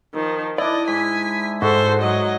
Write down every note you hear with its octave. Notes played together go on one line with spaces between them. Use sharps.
D#3 F3
D4 E4 D5 D#5
G#2 G#5 B6
G#2 F#4 A4 C5
F#3 D#5